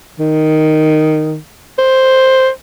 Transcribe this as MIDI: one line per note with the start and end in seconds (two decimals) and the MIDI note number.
0.19 1.37 51
1.78 2.50 72